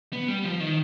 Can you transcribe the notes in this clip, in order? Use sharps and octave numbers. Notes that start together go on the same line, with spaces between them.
B3
G3
F3
D#3